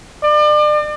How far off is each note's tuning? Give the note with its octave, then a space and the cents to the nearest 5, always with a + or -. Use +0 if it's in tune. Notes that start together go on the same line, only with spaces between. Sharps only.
D5 +35